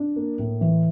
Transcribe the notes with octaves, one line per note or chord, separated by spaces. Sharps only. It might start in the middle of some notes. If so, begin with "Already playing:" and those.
Already playing: D4
A#3
A2
E3